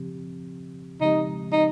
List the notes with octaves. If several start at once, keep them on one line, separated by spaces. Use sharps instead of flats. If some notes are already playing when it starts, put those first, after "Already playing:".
Already playing: C#3 F3 C4 G4
C#3 F3 G#3 C4 D#4 G4
D#4